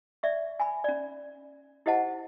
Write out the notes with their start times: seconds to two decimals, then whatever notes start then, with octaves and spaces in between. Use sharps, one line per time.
0.23 D5 E5 C#6
0.60 G#5 B5
0.84 C#4 D5
1.86 E4 G4 C5 D#5 F#5 A5